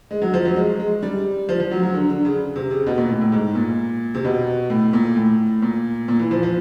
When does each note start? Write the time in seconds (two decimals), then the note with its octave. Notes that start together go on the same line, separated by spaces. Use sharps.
0.11 G#3
0.22 F#3
0.34 F3
0.45 F#3
0.56 G#3
0.80 G#3
1.03 G3
1.49 F3
1.60 F3
1.71 F#3
1.83 F#3
1.94 D3
2.10 D3
2.25 C#3
2.56 C3
2.71 C#3
2.86 B2
2.98 A#2
3.10 A2
3.21 A2
3.32 G#2
3.55 A#2
4.15 C3
4.24 B2
4.70 A2
4.93 A#2
5.16 A2
5.62 A#2
6.08 A#2
6.19 E3
6.31 F3
6.43 F3